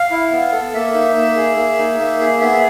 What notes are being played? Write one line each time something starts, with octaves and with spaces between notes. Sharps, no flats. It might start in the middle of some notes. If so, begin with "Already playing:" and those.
Already playing: F5
E4
B3
A4
A#3 E5
D#4
A#3
G#4
A#3
D#4
A#3
G#4
B3 E5